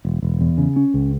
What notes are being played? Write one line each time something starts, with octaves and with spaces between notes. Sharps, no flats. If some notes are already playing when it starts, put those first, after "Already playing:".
E1
E1
E2
C#3
C#4
C#2